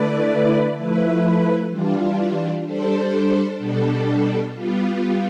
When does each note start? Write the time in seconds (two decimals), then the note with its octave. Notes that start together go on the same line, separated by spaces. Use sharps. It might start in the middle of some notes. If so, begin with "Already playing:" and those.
Already playing: D3 A3 E4 B4 D5
0.76 F3 A3 E4 B4
1.70 E3 G3 D4 F4
2.64 G3 D4 A4 C5
3.59 B2 G3 D4 A4
4.55 G3 B3 F4